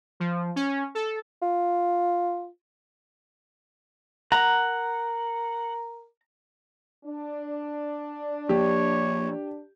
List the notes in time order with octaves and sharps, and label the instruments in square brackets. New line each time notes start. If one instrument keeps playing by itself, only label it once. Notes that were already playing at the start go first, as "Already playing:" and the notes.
[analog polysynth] F3
C#4
A4
[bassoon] F4
[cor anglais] A#4 [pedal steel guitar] F#5 [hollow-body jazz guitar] A#5
[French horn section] D4
[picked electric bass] F3 A#3 [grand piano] G4 [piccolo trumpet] C#5